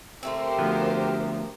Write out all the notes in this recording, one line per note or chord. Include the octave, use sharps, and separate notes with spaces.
D3 A3 C4 G4 A#4 C5
D2 F3 B3